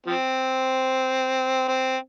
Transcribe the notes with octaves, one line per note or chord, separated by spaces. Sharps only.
F3 C4
C4